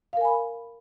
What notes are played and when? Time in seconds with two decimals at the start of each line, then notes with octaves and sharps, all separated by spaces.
0.13 F5
0.17 A#4
0.21 G#5
0.25 B5